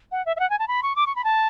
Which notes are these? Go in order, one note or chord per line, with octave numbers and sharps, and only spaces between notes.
F#5
E5
E5
F#5
G#5
A5
B5
C#6
D6
C#6
B5
A5